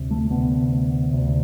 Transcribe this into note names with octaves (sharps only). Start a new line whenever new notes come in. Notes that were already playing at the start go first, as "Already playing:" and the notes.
Already playing: D2 C3
A3
D2 C3 B3
D2 C3